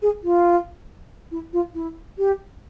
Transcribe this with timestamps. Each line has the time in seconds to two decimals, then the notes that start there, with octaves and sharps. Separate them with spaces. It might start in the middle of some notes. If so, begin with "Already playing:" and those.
0.02 G#4
0.24 F4
1.31 E4
1.53 F4
1.75 E4
2.18 G4